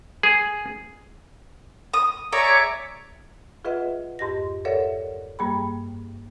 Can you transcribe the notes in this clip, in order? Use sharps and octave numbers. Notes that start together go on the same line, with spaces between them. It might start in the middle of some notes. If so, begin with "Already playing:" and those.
G#4
D#6
G#4 C#5 D5 E5 A#5
F4 G#4 B4 D#5 E5 F#5
F2 G#2 G4 D#5 A#6
A4 A#4 C#5 D5 E5 F#5
G2 G3 A#3 G#4 G5 B5